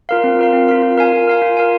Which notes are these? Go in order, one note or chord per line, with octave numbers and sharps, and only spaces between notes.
F4 A#4 F5
C4
F4 A#4 F5
C4
F4 A#4 F5
F4
A#4 F5 G#5
F4
A#4 F5 G#5
F4
A#4 F5 G#5